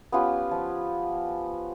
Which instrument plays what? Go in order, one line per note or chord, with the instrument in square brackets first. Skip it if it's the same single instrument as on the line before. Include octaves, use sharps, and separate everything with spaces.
[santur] B3 C#4 F4 G4
F3